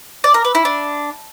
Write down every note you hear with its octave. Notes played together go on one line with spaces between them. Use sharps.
D5
A#4
B4
E4
D4